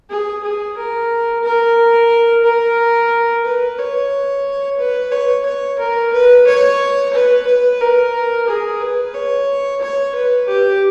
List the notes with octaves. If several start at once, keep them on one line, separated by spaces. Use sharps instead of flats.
G#4
G#4
A#4
A#4
A#4
B4
C#5
B4
C#5
C#5
A#4
B4
C#5
B4
B4
A#4
G#4
B4
C#5
C#5
B4
G4